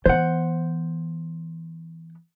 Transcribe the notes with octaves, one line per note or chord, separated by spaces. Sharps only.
E3 B3 C5 F#5